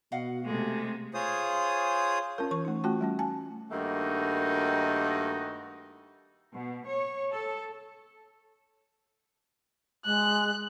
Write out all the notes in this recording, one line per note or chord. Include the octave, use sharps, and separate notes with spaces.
B2 F#4 D#5 F5 F#5
C3 G#3 A3
F4 G#4 C5 C#5 D#6
C#4 F4 A#4
E3 C#6
A3 D#4
A3 C#4 F4 F#4 G5
G3 A3 C#4
G#5 A5
G2 D#3 A3 A#3 D#4 F#4
B2
C#5
A4
G#3 F#6